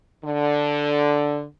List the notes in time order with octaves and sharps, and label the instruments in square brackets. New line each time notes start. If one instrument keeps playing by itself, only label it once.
[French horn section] D3